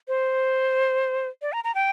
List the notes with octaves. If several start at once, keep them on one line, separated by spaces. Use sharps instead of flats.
C5
D5
A#5
A#5
G5